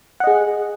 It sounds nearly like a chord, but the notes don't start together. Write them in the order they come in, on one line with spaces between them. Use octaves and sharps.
F#5 D#5 G#4